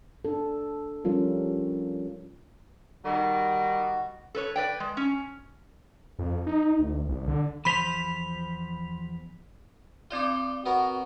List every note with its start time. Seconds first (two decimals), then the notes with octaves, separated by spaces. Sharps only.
0.25 D4 A4
1.05 F3 G3 C#4 F4 A#4
3.04 D#3 G3 F#4
4.35 A4 B4 C#5
4.56 B4 D5 G5
4.80 G#3
4.97 C#4
6.19 F2
6.47 D#4
6.79 D2
7.09 C2
7.28 D3
7.65 E2 F3 C5 B5 B6 F7
10.11 C4 D4 F4 D5 G7
10.66 B3 F#4 A#4